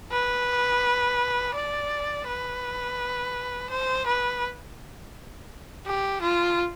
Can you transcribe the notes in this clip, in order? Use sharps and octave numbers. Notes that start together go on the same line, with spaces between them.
B4
D5
B4
C5
B4
G4
F4